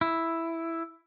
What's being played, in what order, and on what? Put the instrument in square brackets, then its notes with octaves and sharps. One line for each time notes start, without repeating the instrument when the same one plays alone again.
[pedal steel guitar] E4